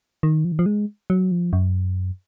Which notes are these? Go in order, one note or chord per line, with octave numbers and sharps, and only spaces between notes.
D#3
F3
D#3
F3
G#3
F#3
F3
F#2